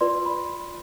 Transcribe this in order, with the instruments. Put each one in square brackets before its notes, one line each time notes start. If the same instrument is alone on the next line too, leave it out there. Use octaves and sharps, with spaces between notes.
[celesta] F4 B4 D5 C6
B5